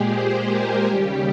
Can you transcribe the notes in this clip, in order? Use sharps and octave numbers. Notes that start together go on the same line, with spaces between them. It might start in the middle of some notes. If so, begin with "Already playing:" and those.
Already playing: A#2 G#3 G4 G#4
C5
A#4
D#2 C#3 G3 G4